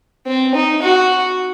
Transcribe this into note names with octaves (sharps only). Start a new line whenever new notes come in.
C4
D#4
F#4